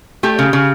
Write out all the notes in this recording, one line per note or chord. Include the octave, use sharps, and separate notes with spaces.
A3 G4
C#3
C#3